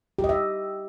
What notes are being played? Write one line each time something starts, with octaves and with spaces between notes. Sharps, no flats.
G4
D#5
E5